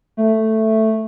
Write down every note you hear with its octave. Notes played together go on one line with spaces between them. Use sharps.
A3